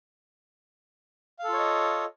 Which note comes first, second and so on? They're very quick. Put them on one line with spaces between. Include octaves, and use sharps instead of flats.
F5 A4 F4 C#5 D#5